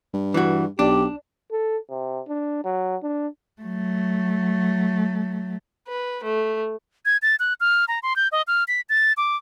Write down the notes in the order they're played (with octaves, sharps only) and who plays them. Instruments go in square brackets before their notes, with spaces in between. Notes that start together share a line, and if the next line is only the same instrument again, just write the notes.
[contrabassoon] G2
[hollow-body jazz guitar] E3 F#4
[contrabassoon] B1 [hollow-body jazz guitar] D4 [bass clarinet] G4
[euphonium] A4
C3
D4
F#3
D4
[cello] F#3 A3
[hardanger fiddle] B4
A3
[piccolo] G#6
A6
F#6
F6
A#5
C6
G6
D#5
F6
B6
A6
D6